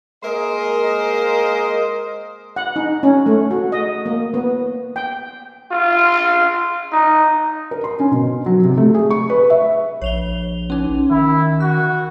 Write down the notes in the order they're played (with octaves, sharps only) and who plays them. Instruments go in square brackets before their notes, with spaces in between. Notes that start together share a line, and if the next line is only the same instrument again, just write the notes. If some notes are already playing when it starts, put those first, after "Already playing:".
[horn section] G#3 A#3 A#4 C5 D#5
[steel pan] F#5
D#4
C#4
A3
F#4
D#5
A#3
B3
G5
[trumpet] F4
D#4
[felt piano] A#4
C6
C#4
B2
F#3
C3
A3
G#4
C#6
B4
E5
[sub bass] A#1 [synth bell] C#5 F7 G7
[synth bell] C#4 D#4
[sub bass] D#3 [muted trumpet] E4
[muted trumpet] F#4 [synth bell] F#6